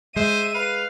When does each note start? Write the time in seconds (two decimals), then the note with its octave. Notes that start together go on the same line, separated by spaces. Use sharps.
0.17 G#3 C5 E5 D#7
0.55 B4 F5